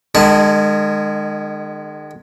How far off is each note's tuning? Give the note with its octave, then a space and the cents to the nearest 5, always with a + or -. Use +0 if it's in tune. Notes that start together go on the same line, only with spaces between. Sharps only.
D#3 -40 G#3 -10 A5 +0